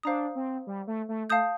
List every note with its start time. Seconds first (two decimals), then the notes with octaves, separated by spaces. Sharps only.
0.03 D4 C5 F5 A#5 D#6
0.35 C4
0.67 G3
0.87 A3
1.09 A3
1.30 A3 F5 A5 D#6 G6